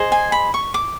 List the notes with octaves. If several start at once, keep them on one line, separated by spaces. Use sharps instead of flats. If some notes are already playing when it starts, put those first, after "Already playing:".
Already playing: G#4 C5 D#5
G#5
B5
C#6
D6